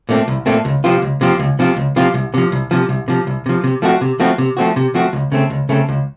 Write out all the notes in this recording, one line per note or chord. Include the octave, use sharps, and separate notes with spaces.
A#2 A3 C4
C2
A#2 A3 C4
C#2
C3 F3 C4 F4
C#2
C3 F3 C4 F4
C#2
C3 F3 C4 F4
C#2
C3 F3 C4 F4
C2
C3 F3
C2
C3 F3
C2
C3 F3
C2
C3 F3
C3
F3 A3 C4 F#4
C3
F3 A3 C4 F#4
C3
F3 A3 C4 F#4
C3
F3 A3 C4 F#4
C#2
C#3 A3 C4
C#2
C#3 A3 C4
C#2